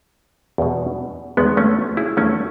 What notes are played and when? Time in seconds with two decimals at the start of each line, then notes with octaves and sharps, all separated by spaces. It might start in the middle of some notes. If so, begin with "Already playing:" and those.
0.58 E2 B2
1.37 E2 D#3 G#3 B3
1.57 A3 C#4
1.97 E4 G#4
2.17 E2 D#3 A3 C#4